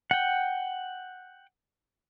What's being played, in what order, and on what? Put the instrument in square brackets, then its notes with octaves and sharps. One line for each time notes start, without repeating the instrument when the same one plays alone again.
[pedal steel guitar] F#5 G5